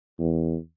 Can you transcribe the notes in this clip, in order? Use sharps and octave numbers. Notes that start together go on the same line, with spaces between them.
E2